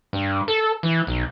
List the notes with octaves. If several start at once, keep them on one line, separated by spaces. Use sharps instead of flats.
G2
A4
E3
B1